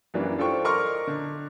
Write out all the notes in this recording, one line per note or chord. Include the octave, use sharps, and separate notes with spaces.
F#2 E3 F#3 G3 A#3 D4
D4 F4 A4 C5 G5 C#6
A#4 D5 D#5 C6 C#6 F6
D3